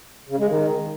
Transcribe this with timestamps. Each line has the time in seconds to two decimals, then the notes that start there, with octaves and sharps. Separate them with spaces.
0.29 C#3
0.39 G#3
0.49 D#3